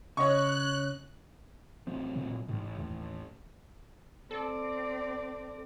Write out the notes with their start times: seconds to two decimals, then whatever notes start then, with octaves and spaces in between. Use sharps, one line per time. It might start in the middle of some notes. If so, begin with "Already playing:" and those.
0.17 C#3 C#5 D#5 C#6 F#6
1.87 A1 F#3 C4
2.16 A#2
2.48 A1 G#2
2.78 A1 D#2
4.31 C4 A4 D5